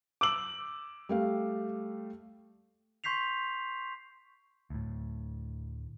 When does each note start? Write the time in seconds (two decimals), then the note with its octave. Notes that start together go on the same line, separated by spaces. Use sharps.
0.21 D6 E6 F#7
1.09 G3 A3 F5
3.04 C6 C#6 G6 B6 C7 F7
4.70 D2 A2